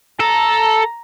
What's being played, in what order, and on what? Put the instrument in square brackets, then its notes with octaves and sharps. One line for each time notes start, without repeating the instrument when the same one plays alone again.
[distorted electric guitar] A4 [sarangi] A#5